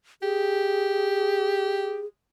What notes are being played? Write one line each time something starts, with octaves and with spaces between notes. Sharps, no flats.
G4 G#4